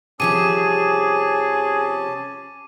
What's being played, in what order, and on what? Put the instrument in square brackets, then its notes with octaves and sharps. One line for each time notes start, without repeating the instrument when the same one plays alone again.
[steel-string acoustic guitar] C3 F3 G3 [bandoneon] C#4 A5 [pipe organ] G#4 [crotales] D6 D#7